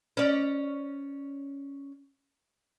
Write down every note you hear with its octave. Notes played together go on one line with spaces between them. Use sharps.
C#4 D5